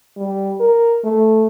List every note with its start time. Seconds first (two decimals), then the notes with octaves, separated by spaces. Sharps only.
0.17 G3
0.60 A#4
1.04 A3